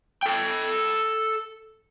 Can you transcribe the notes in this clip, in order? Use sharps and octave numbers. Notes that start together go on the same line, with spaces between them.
A4 G5